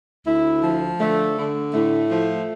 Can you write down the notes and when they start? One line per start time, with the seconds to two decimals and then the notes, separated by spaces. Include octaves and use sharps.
0.25 D2 E4
0.62 F3
0.99 D3 A3
1.36 D3
1.73 A2 A3
2.09 F3